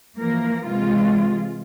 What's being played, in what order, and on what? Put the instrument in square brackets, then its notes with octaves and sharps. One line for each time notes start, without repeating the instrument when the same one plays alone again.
[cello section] E3 F3 A#3 A#4
C3 E3 G#3 F4